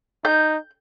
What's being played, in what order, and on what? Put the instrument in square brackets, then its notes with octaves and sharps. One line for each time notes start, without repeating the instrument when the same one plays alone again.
[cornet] D#4 [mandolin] G6